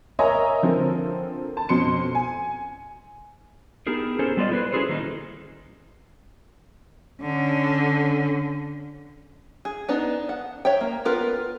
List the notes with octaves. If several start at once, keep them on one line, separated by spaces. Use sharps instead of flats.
A#4 C#5 D#5 E5 G#5 A#5
D3 F3 C4 A4 A#4
A5
F2 B2 C#4 C6 C#7
G#5
B3 D#4 E4 G4 G#4 A#4
C#4 G#4 A4 C5
G3 B3 F4 A4 D5 D#5
E4 B4 C5
C#4 E4 F#4 G#4 A4 C5
D#3 G3 A#3 D#4
D3 C#4
G#4
B3 D4 D#4
F#5
C#5 E5 G5
A#3
B3 F4 A#4 B4